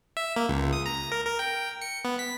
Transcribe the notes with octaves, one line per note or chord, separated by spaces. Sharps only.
E5
A#3
C#2
D#6
A#5
A#4
A#4
G5
C#7
B3
B6